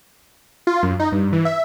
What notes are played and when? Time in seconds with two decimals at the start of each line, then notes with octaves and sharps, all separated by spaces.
0.67 F4
0.83 F#2
1.00 D#4
1.12 G2
1.33 E3
1.45 E5